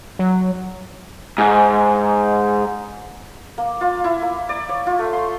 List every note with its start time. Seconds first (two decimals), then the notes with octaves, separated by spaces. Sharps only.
0.19 F#3
1.38 G#2
3.58 A#3
3.81 F4
4.04 E4
4.22 A#3
4.49 D5
4.69 C#5
4.87 F4
4.99 A3
5.13 C6